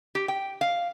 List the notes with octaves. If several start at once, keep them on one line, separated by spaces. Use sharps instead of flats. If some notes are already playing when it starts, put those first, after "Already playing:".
G4
G5
F5